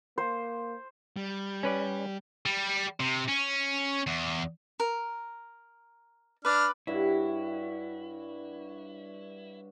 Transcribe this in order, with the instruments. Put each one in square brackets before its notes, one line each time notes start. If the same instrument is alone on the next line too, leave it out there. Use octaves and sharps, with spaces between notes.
[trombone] A#3 [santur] C5
[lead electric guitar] G3
[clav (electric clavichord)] C#4 B4 D5
[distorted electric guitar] G3
C3
C#4
E2
[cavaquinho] A#4
[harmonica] D4 F6 [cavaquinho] B4 D5
[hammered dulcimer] G2 F#4 C#5 [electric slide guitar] E4